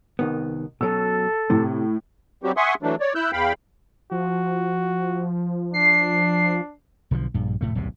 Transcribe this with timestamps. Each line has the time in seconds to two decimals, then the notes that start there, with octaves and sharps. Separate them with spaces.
0.19 C2 D#3 B3
0.81 B2 F#3 C#4 A4 E6
1.50 A2 C3
2.43 F#3 G3 C4 F#4 G4
2.57 E5 F#5 G#5 C6 C#6 D#6
2.83 E3 F#3 A3 D4
3.00 C#5 D5
3.15 E4 E6 F#6 G6
3.32 E2 F5 G5 B5
4.11 F3 F#4
5.74 D4 C7
7.11 B1 D3 D#3 F3
7.34 A#1 G2
7.61 F1 A2 A3
7.75 D1 B1 G2 C3